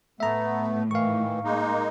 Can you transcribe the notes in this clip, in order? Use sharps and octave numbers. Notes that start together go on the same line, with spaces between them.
A2 A3 B3 E5 A#5
D#3 E3 F5 C#6
G#3 A#3 D#4